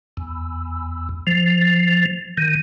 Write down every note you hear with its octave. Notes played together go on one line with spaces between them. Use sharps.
E2
F3
D#3